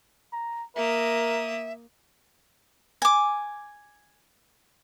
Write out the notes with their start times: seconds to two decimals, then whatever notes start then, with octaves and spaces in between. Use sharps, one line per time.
0.33 A#5
0.76 A#3 A#4 E5 D#6
3.02 G#5 D6